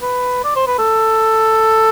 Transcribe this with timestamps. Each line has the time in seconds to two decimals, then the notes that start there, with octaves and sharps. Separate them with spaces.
0.02 B4
0.44 D5
0.56 C5
0.67 B4
0.79 A4